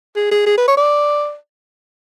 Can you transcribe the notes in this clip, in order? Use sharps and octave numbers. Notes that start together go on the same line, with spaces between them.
G#4
G#4
G#4
B4
C#5
D5